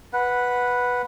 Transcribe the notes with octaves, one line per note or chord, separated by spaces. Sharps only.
B4 F#5